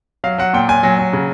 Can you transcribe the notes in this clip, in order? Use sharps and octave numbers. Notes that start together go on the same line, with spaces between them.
F#3 F5
F#3 F#5
A#2 G5
A#2 G#5
F#3
F#3
C#3